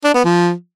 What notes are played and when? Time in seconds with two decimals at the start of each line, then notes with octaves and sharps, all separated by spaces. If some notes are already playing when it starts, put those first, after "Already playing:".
0.04 D4
0.15 B3
0.25 F3